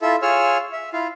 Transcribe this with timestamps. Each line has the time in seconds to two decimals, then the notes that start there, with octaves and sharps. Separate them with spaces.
0.02 E4 F4 A4 E5
0.22 F4 G#4 C#5 E6 F6
0.73 E5
0.93 E4 F4 F5